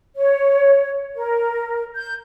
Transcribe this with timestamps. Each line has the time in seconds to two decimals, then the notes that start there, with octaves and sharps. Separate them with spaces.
0.16 C#5
1.15 A#4
1.96 G6